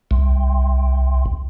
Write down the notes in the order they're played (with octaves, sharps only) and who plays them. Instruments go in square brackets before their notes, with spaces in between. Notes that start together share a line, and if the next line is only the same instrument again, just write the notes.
[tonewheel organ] C2